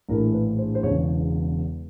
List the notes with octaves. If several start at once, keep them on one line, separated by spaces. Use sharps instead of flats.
A#1 A2 E3 A#4
B4
C5
C5
E1 E2 C#3 C#5